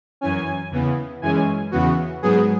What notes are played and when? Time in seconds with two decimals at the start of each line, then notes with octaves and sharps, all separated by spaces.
0.21 F#2 E3 C#4 G#5
0.71 E2 C#3 E3 B3
1.22 F#2 E3 G#3 C#4 G#5
1.71 E2 C#3 E3 B3 F#4
2.22 G#2 F#3 B3 G#4